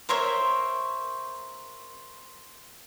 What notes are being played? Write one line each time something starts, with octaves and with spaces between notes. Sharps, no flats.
A#4 C5 C#5 E5